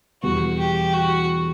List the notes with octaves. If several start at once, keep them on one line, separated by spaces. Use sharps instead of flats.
E2 B2 G3 B3 F#4
G4
F#4